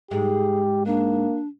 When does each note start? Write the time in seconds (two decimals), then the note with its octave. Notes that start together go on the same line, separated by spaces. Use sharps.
0.11 G#2 G4 G#4
0.86 A#3 D4